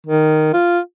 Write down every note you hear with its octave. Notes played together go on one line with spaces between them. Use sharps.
D#3
F4